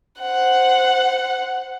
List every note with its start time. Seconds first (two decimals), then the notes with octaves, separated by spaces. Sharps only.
0.20 C5 F#5